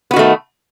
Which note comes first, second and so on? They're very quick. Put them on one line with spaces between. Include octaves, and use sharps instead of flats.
B3 F#4 D#3 A3